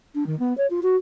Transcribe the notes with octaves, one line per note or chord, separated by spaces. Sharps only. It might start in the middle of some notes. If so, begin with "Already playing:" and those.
D4
D#3
B3
C#5
F4
F#4